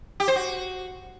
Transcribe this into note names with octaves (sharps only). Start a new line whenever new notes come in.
G4
C5
F#4